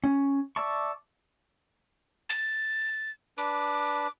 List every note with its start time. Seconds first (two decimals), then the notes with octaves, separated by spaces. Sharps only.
0.04 C#4
0.56 D5 E5 A5 C#6
2.29 A6
3.38 D4 B4 D6